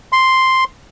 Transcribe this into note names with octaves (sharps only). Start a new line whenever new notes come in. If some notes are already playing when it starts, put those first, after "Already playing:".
C6